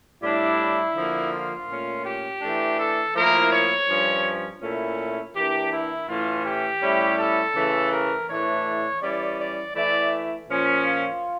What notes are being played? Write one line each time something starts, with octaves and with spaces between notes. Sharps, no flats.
A2 G3 D4 E4
D3 F3 A#3
F4
A#2 A3 C#4
G4
E3 A3 D4
A4
A2 F3 A#3 E4 A#4
C#5
G2 F3 C#4
A#2 A3 C#4 E4
E3 A#3 D4 G4
E4
A2 E3 A3 C#4 F4
G4
A2 G3 C#4 E4
A4
C#3 E3 A3
A#4
A2 E3 A3 D4 C#5
E3 G3 C#4 E4 D5
D5
E3 A3 E4 D5
A#2 F3 C#4
F4